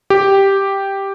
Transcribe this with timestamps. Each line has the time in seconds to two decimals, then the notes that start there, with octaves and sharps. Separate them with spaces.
0.10 G4